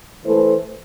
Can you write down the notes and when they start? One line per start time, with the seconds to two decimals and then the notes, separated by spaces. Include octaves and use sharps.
0.25 E3 A3 E4 A4 C5